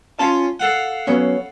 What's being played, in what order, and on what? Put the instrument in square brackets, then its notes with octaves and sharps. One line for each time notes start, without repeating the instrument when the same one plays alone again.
[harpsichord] C#4 F4 [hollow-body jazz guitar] A5
[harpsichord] A4 F5 F#5
[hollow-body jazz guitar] F#3 B3 C#4